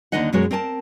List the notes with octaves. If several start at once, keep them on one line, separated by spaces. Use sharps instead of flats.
D#2 D3 D#3 D#4 D#5 F#5
F#2 B2 G#3 F#4 A#4 C#5
C4 A#4 G#5 A5